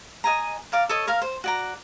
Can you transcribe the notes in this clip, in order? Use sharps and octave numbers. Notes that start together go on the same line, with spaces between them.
D#5 G#5 A#5
D5 F5 A#5
A4 C#5 D#5
A#4 F5
C5
F#4 D5 A#5